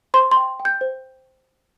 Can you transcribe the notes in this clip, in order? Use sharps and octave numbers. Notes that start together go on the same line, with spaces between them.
C5 C6
C6
G5
G5
G6
C5